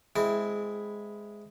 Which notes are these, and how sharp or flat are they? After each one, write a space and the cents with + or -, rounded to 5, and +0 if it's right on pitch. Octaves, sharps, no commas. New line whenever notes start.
G#3 +0 C4 -20 E4 +0